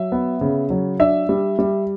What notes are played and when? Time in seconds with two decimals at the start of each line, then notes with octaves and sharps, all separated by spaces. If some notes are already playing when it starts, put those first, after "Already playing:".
Already playing: F#3 E5
0.12 B3
0.41 C#3
0.70 F#3
0.99 D4 E5
1.29 G3
1.59 G3